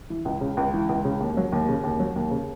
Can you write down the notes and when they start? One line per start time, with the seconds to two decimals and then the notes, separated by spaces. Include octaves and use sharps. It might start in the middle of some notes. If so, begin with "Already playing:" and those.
0.10 E3
0.25 C#2
0.41 C#3
0.57 C#2
0.74 E3
0.89 C#2
1.05 C#3
1.20 D#2
1.37 F#3
1.52 D#2
1.69 C#3
1.83 D#2
2.00 F#3
2.16 D#2
2.31 C#3